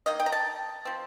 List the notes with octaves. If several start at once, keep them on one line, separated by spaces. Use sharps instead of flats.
D#3 A#3 D#5
G5
A#5
A5
F3 C4